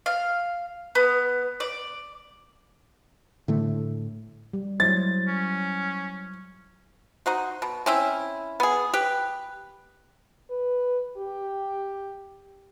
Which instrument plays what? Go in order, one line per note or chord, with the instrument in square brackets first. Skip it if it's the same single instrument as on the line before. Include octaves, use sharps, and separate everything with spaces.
[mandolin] F5
B3
D5
[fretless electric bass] A2 D3 A3
[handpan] G3
[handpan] F#3 E4 C5 [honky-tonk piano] A6
[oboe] C#4
[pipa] D#4 F#4 C5
B2
C4 C#4 E4
B3 G#4
G4 B4
[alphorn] B4
G4